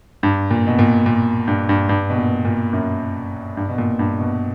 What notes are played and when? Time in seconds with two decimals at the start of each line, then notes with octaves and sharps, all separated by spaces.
0.23 G2
0.51 A#2
0.67 B2
0.79 A#2
1.06 A#2
1.48 G2
1.69 G2
1.89 G2
2.10 B2
2.18 A#2
2.45 A#2
2.73 F#2
3.57 G2
3.69 B2
3.78 A#2
3.99 G2
4.19 B2